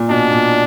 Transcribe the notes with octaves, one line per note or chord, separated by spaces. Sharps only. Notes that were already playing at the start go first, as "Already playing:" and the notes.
Already playing: A#2
B2 D4
A#2